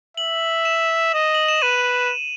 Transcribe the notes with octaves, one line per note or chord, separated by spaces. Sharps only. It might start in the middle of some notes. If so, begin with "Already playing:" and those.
E5 F#7
E7
D#5
F#7
E7
B4 D#7